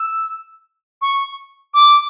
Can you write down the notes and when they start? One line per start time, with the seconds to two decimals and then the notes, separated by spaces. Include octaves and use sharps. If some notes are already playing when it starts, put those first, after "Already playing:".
Already playing: E6
1.01 C#6
1.74 D6